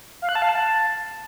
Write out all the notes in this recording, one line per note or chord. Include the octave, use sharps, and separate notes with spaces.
F5
F#6
A5
F5
A5